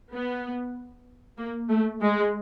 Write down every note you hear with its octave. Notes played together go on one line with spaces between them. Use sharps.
B3
A#3
A3
G#3